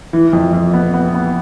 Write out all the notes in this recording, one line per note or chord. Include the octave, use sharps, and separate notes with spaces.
E3
F2
F2
B3
B3
B3